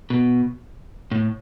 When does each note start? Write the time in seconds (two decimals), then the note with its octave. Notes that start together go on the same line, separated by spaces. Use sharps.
0.10 B2
1.11 A2